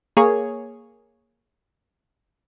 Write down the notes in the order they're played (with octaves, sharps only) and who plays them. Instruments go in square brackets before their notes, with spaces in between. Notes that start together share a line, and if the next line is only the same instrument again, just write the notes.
[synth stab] A#3 G#4 C#5